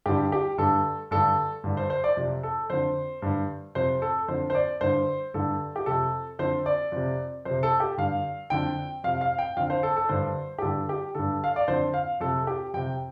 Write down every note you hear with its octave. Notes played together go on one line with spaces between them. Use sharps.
G2 D3 G4
G4
G2 D3 A4
G2 D3 A4
G2 D3
C5
C5
D5
F2 C3
A4
F2 D3 C5
G2 D3
F2 C3 C5
A4
F2 D3 C5
C5
D5
G2 D3 C5
G2 D3 A4
G4
F2 C3 A4
F2 D3 C5
D5
F2 C3
F2 C3 C5
A4
G4
G2 D3 F5
F2 D3 G5
F2 C3 F5
F5
G5
F2 D3 F5
C5
A4
A4
G2 D3 C5
G4
G2 D3 A4
G4
G2 D3 A4
F5
D5
F2 D3 C5
F5
F2 C3 A4
G4
F2 C3 G5